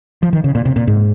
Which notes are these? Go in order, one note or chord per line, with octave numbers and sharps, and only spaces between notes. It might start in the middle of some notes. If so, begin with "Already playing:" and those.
F3
D#3
C#3
A#2
C3
A#2
G#2